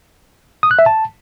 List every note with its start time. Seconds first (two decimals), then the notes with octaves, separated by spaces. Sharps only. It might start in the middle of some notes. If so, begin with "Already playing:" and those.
0.63 D#6
0.71 F#6
0.79 E5
0.86 A5